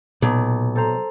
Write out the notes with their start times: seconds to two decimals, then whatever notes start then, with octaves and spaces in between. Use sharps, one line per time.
0.22 B1 A#2
0.75 A4 C5 A#5